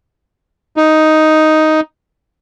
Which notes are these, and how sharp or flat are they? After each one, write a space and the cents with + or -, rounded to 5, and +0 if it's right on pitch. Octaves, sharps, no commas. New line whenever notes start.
D#4 +5